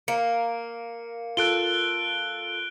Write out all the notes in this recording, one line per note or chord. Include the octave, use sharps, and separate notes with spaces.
A#3 C#7
F4 A4 F#6 D7 G7